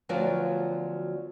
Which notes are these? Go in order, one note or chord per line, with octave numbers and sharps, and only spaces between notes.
D2 F3 F#3 B3 F#4 D5